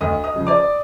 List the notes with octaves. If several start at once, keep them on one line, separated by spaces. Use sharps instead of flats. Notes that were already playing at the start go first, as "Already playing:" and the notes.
D2 D#5 D#6
D#5 D#6
C#3 F3
D5 D6